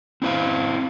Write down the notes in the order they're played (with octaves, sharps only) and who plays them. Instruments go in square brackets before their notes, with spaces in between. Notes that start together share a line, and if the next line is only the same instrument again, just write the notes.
[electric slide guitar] C4 E4 C5 F5